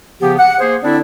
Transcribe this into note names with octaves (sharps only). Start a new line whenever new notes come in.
C#3 F3 B3 G4
F#5
A#3 G#4 C5
D3 C4 D4 E4 D5